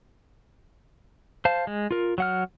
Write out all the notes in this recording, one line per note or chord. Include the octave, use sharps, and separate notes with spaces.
C5 F5 A5
G#3
F4 A#4
F#3 F#5 F6